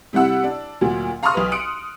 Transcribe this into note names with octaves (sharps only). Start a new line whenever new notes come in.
C3 G3 E4 F#5 E6
D4
D2 A#2 F#3
F5 A#5 C6 C#6 D#6 F6
B1 B4
C6 D#6 F#6 C#7 D7